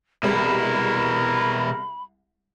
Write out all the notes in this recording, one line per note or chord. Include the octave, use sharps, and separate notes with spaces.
C2 B2 G3 G#3 E4 A#4 B5